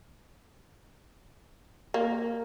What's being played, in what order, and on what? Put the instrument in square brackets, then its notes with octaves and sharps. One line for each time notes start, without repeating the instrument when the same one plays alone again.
[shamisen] A#3